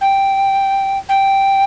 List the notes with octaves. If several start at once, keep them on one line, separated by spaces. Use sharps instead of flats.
G5
G5